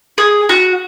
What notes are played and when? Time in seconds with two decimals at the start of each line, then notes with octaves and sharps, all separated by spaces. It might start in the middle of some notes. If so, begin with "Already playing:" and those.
0.18 G#4
0.49 F#4